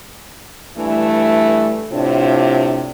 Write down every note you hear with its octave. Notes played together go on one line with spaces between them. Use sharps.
G2 E3 A3
A2 C3 D4 F4